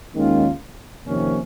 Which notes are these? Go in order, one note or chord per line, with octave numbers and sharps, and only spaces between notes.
D#2 D#3 G#3 C#4 F4
F2 C3 D#3 A#3 C#4